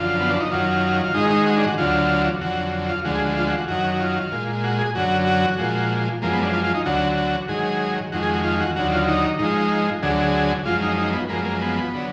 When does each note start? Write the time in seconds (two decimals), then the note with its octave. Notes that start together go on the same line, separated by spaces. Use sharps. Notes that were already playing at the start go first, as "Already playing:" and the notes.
Already playing: F#2 D3 F3 F4
0.20 B3
0.30 D4
0.40 D#4
0.51 F#2 D#3 F#3 F4
1.04 F4
1.14 G#2 D#3 G#3 D#4
1.31 D#4
1.46 F#4
1.57 D4
1.67 F#4
1.78 D2 D3 F#3 F4
2.41 F2 D3 F#3 F#4
2.89 F4
3.05 D2 D3 F3 G#3 F#4
3.15 G#4
3.26 F#4
3.37 F4
3.47 F#4
3.58 F#4
3.68 F#2 D#3 F#3 F#4
3.99 F4
4.32 A#2 G#3
4.64 F#4
4.79 G#4
4.95 F#2 D3 F#3 F#4
5.27 F#4
5.58 A#2 F3 G#3
6.22 F#2 F3 G#3 A#3
6.33 B3
6.43 D4
6.53 F4
6.64 F4
6.74 D#4
6.85 D2 D3 F#3 F#4
7.17 F#4
7.48 G#2 D#3 F#3 G#4
8.12 F2 D#3 G#3 F#4
8.23 G#4
8.33 F#4
8.44 F4
8.60 F#4
8.75 D#2 D3 F#3 F#4
8.92 F4
9.08 D#4
9.39 G#2 F3 G#3 D#4
10.03 D2 D3 F#3 G#4
10.20 G#4
10.65 F#2 F3 G#3 F4
10.82 D#4
10.98 D#4
11.13 B3
11.29 F#2 F3 G#3 A#3
11.45 A#3
11.61 B3
11.95 D3 F#3